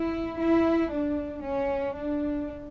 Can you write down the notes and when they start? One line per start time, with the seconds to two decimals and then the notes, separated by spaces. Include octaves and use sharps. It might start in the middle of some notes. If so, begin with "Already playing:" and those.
Already playing: E4
0.39 E4
0.91 D4
1.43 C#4
1.95 D4